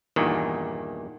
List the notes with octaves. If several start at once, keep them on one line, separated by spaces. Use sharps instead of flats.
E2 G2 A#2 D#3